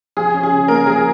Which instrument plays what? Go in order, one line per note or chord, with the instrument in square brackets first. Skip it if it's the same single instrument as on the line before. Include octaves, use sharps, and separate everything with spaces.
[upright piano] F3 [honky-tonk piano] G#4
[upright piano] C#4
[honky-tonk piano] G#4
[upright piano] C#3
[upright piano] A#3 [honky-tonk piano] A#4
[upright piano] F3 [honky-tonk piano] G#4